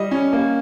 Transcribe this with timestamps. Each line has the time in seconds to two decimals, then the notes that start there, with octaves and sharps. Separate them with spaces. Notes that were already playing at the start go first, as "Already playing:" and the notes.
Already playing: G3 D#5
0.11 C#4
0.33 A#3